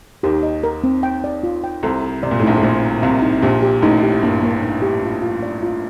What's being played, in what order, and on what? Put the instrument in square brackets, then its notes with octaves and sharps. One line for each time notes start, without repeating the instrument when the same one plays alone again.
[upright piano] D#2 D#3 [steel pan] G4
[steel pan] D#5
A#4
C4
G5
D5
F4
G5
[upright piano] C2 C3 [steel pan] A4
[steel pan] A4
[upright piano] C3 [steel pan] D5
[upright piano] A#2
A2
[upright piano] A#1 A#2 [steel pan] D#4
[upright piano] A2
[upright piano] A#1 A#2 [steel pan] C5
[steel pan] D#4
[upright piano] C2 C3 [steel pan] F5
[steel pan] D#4
[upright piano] A#1 A#2 [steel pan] G4
[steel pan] G4
[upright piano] A1 A2 [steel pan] D#4
[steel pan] G4
[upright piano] G2 [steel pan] A#3
[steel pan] A#3
D#4
G4
F4
F4
D5
F4